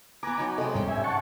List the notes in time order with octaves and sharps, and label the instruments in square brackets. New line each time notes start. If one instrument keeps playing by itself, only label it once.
[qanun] B3 B4 [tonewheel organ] G#5 A#5 D6
[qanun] F#3 D#4
[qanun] C3 G#3 [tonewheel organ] A4 D#5
[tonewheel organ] G#2 G3 [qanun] C#4 G5
[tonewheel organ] E5 G#5
F#5 A5 C#6